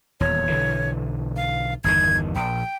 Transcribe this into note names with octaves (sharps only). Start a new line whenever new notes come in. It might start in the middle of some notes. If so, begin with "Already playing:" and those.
D#1 E2 C#5
B1 D3 E3
F5
G1 E2 D#3 G#6
A#1 G5